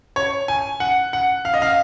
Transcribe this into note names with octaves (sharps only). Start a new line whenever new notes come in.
C#5
G#5
F#5
F#5
F5
D#5
F5